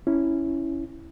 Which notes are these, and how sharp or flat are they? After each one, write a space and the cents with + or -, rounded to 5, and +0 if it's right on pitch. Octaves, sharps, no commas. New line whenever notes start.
C#4 +0 E4 +0